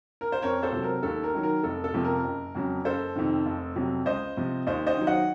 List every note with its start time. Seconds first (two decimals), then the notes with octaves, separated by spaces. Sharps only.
0.21 A#4
0.32 C5
0.42 F2 A#4 C#5
0.63 A4 C5
0.73 C3 F#3
0.83 A#4
1.03 D#2 A4
1.23 A#4
1.34 D#3 F#3
1.43 A#4
1.63 F1 A4
1.84 A4
1.94 F2 C3 F3
2.04 A#4
2.24 F#1
2.55 F2 C#3 F#3
2.85 F#1 A4 C5
3.16 F2 C3 D#3
3.46 F1
3.76 F2 C3 F#3
4.06 C#2 C5 D#5
4.37 C3 F3
4.67 D#2 C5 D#5
4.87 C5 D#5
4.97 D#3 F#3
5.07 D#5 F#5